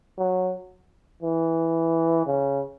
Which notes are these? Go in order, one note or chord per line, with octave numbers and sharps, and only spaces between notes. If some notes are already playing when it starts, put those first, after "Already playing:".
F#3
E3
C#3